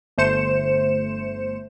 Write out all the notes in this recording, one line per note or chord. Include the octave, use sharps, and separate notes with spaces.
G1 A3 C5 C#7 E7